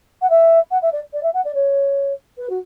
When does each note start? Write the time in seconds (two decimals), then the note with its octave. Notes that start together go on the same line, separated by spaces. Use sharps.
0.22 F#5
0.30 E5
0.71 F#5
0.82 E5
0.93 D5
1.13 D5
1.23 E5
1.34 F#5
1.45 D5
1.55 C#5
2.38 B4
2.50 F#4